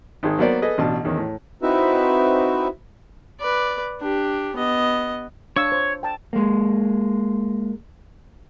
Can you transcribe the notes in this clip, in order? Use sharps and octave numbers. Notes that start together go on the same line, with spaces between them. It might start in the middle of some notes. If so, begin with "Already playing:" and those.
G#1 D#3 G#4
F#3 A#3 B3 A#4 C5 D5
G#4 A4 B4 D#5
A1 B2 D4 A5
E2 D#3 C#4
A2
C4 D#4 E4 F#4 B4 E5
B4 D5
D4 G4
B3 D#5
D4 C#5 F5 E6
C5
G5 A5
G#3 A#3